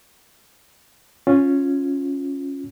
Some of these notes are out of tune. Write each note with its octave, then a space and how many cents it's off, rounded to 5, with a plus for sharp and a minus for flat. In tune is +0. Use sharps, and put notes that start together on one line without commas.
C#4 +0 F4 +10